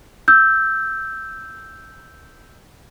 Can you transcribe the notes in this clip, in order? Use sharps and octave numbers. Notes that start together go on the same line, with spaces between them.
E6 G6